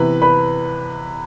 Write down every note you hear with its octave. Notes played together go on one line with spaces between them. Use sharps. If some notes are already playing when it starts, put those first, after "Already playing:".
Already playing: C3 E3 B3 B4 B5
B4 B5